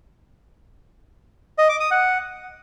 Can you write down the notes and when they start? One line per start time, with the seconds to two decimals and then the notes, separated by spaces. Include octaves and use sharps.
1.58 D#5
1.69 D6
1.80 D#6
1.91 F#5